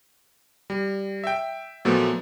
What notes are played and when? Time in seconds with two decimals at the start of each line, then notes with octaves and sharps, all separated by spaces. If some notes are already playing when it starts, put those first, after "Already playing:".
0.70 G3
1.24 E5 G5
1.85 A#2 F3 F#3 A3 B3